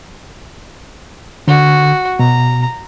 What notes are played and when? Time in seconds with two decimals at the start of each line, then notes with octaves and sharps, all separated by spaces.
1.48 D3 F#4
2.19 B2 A#5